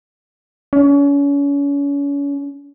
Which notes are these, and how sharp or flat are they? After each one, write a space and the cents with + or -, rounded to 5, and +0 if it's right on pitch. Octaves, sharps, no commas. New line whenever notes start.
C#4 +35